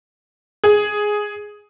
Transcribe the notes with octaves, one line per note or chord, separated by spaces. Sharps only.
G#4